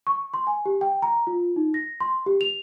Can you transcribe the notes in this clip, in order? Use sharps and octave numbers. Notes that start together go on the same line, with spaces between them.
C#6
C6
G#5
G4
G5
A#5
F4
D#4
A#6
C6
G4
F7